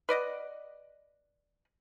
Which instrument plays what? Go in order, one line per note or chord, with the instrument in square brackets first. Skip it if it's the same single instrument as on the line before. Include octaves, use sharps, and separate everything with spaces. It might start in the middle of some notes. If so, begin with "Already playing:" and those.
[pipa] B4 D5 D#5 F#5